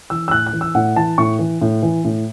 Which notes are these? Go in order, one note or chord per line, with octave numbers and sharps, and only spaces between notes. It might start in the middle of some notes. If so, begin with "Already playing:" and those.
E3 E6
E6
A2 F#6
F#6
E3
E6
A2 F#5
E3 A5
A2 C#6
E3
A2
E3
A2